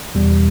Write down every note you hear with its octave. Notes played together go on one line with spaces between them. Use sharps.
E2 B2 G3